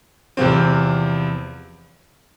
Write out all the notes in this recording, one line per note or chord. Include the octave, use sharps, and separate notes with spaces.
E2 C3 F3 C4